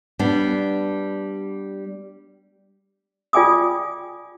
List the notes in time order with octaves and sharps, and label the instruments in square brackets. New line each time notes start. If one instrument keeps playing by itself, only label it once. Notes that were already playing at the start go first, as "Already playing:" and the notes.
[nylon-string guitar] G3 B3 D4
[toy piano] F4 D5 G5 G#5 D6 D#6